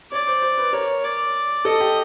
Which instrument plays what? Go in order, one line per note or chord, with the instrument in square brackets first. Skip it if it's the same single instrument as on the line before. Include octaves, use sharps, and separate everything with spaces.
[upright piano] C#5 [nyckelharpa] D5
[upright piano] C5
C5
B4
[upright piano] A#4 [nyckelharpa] C#5
[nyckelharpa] D5
[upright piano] A4 [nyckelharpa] D#5
[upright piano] G4